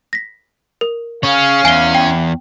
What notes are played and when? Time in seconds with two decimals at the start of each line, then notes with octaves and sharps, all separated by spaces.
0.13 A#6 B6
0.81 A#4
1.23 C#4 G#4 C#5 F5
1.65 E2 G#5 C7 G7
1.95 G5